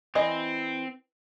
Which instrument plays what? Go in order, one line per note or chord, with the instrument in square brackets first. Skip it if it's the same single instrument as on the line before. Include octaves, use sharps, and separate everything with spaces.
[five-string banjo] E3 D#5 [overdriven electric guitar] C4